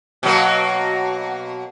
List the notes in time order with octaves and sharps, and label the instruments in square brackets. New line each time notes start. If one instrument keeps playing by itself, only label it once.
[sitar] B2 F#3 A#3